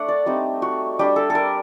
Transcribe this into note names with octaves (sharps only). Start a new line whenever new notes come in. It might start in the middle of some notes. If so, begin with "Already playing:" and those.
Already playing: A3 D4 F#5
D5
G3 C4 D#4
F#4
G3 D4 G4
A4
A4
A#4